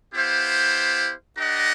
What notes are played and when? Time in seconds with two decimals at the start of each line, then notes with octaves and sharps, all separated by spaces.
0.12 B3 E4 G4 C5 F5
1.37 D4 G4 A#4 D#5 F#5